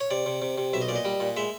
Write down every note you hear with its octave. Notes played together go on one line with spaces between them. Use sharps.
C#5
C3 D5
C3
C3
C3
B1 E5
D#5
A#2 D5
D#5
G3
A#2
G#3 E5